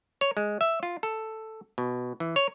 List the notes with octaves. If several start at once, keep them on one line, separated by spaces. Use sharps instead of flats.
C#5
G#3
E5
F4
A4
B2
E3
C#5